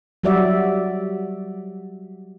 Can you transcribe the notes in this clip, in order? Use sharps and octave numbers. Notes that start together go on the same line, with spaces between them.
F#3 G3 F#4 G4 D5 E5